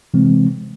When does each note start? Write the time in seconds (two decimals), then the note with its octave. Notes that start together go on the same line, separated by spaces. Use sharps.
0.14 C3 E3 G#3 C4